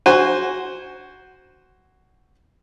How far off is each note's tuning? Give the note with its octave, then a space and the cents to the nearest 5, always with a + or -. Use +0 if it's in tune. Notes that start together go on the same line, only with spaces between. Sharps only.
F#4 +10 C5 +0 G#5 -20